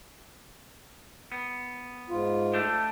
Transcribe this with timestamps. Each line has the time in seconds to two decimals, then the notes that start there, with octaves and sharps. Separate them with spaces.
1.32 B3
2.10 G#2 F4
2.54 A3 D4 G4